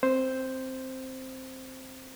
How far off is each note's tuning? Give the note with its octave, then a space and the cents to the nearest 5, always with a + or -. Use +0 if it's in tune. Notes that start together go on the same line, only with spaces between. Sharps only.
C4 +0 C5 +0